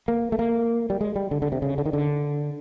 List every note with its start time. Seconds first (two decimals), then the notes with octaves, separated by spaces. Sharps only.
0.08 A#3
0.32 A3
0.39 A#3
0.90 G3
1.01 G#3
1.16 G3
1.31 D3
1.42 D3
1.52 C3
1.62 C#3
1.78 D3
1.86 D#3
1.93 D3